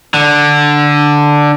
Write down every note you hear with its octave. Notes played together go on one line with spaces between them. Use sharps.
D3